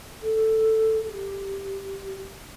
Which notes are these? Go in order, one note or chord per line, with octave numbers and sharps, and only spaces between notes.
A4
G4